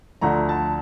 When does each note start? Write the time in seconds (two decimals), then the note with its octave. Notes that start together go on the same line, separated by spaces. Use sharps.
0.21 D2 D3 F3 A3 A#5
0.49 A5